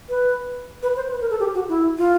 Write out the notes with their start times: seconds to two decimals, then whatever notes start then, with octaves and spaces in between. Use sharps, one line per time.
0.09 B4
0.82 B4
0.96 C5
1.10 B4
1.21 A#4
1.30 A4
1.40 G4
1.55 F#4
1.69 E4
1.98 F4